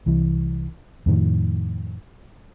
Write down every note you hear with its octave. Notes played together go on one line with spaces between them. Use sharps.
C2 E3
F2 A2 D#3